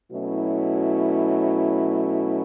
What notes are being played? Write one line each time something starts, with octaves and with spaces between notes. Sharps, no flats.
B2 F#3 A3 C#4 E4